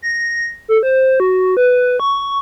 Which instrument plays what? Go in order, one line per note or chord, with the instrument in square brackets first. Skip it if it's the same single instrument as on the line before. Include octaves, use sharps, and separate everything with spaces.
[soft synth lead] A#6
A4
C5
F#4
B4
C#6